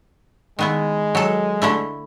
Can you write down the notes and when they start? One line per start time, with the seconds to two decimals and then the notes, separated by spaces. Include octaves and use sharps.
0.59 D#3 G#3 B3 E4
1.15 F#3 A4
1.62 D3 A3 E4